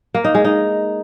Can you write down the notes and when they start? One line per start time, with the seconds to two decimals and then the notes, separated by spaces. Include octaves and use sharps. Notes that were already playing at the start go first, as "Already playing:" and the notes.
0.14 A#3
0.25 D#4
0.35 G#3
0.45 D#4